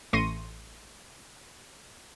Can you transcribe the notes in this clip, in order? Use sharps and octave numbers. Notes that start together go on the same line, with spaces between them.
A1 A3 C6 C#6 A#6 D#7